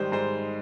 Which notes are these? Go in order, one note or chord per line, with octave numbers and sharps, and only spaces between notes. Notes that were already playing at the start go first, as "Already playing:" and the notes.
Already playing: G#2 D#3 G3 C5
G#2 C5